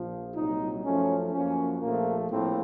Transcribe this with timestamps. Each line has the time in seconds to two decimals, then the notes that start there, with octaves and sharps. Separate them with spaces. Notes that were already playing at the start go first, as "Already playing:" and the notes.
Already playing: A#1 A#2 F3
0.35 C2 A#2 F#3 D#4
0.84 F#2 F3 A3 C#4
1.32 F#2 F3 A#3 C#4
1.81 A#1 A#2 F3 A3 A#3
2.30 A#1 A2 F3 A#3 C4